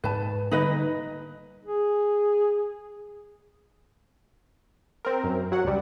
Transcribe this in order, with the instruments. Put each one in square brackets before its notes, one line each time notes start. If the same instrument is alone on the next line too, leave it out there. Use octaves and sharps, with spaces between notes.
[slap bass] G#2 [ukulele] B4 A5
[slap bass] D3 G3 A#3 [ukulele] D#4 B4 D#5
[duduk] G#4
[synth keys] C4 A#4
F#2
F#3 F#5
C#2 F#2 G3